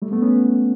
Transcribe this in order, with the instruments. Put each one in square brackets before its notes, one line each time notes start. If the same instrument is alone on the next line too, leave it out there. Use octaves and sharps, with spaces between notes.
[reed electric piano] G3 A3
A3 B3
B3 C#4